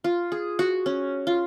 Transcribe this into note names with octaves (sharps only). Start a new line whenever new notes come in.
F4
G#4
F#4
C#4
F4